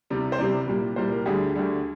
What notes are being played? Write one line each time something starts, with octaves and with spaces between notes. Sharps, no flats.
C2 C3 G3
C5
C2 C3 G3 D5
C2 A#2 G3
C2 A#2 G3 C5
A#4
D2 D3 G3 G#4
D2 D3 G3